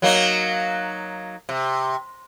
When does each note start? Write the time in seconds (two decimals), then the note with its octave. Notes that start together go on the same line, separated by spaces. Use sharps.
0.02 F#3 A#3 D#4
1.49 C3